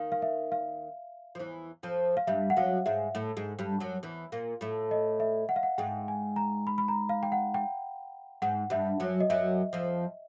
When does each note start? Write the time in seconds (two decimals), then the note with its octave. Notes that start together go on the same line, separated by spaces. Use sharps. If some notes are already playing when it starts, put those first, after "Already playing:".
Already playing: D#2 D#3 F5
0.12 F5
0.22 E5
0.52 F5
1.35 F3
1.39 E2 E3
1.83 F2 F3
2.17 F5
2.27 G2 G3 E5
2.50 F#5
2.57 F#2 F#3 F5
2.86 G#2 G#3 E5
3.15 A2 A3
3.37 G#2 G#3
3.59 G2 G3
3.80 F#2 F#3
4.03 E2 E3
4.32 A#2 A#3
4.61 A2 A3
4.91 D#5
5.20 E5
5.49 F#5
5.56 F5
5.63 F#5
5.78 G#2 G#3 G5
6.08 G#5
6.36 A#5
6.67 B5
6.78 B5
6.88 A#5
7.09 F5
7.23 G5
7.32 F#5
7.54 G5
8.42 G#2 G#3 F#5
8.70 G2 G3 E5
9.00 F#2 F#3
9.20 D#5
9.30 F#2 F#3 E5
9.73 F2 F3